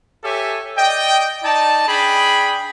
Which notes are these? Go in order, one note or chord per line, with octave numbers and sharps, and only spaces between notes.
G4 A4 C#5 E5 G#5
D5 D#5 G5
D#4 D5 A5
D4 G#4 G5 B5